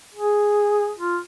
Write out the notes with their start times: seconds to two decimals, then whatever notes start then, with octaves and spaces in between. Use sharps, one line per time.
0.15 G#4
0.98 F4